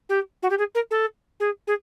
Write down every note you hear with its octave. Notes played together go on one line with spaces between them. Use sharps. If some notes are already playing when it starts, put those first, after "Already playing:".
G4
F#4
G4
G#4
A#4
A4
G#4
G#4